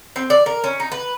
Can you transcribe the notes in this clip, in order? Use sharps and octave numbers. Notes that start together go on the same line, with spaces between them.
C4
D5
A#4
C#4
D#4
B4